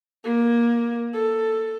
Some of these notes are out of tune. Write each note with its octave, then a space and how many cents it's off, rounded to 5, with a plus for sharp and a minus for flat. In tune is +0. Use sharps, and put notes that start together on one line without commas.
A#3 +15
A4 +10